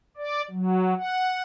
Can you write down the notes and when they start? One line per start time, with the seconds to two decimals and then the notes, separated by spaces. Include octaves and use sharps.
0.17 D5
0.51 F#3
0.98 F#5